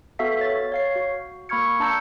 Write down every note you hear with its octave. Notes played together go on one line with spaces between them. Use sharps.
B3 F#4 A4 E5 F5 B6
C#5 A6
C#5 F5 C7
F#4
A#3 B5 C#6 F6 G#6 C#7
D4 A5 A#5 E6 G6 C#7